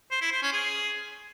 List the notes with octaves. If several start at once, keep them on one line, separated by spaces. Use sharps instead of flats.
C5
E4
C5
C#4
G#4